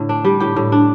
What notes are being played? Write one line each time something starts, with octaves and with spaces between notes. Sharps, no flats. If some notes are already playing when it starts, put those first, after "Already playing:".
Already playing: A2 D3
D4
G3
A2 G4
A2
D4